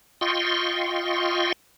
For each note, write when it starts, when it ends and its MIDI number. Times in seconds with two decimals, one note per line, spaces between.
0.21 1.52 65
0.21 1.52 75
0.21 1.52 79
0.21 1.52 84
0.21 1.52 85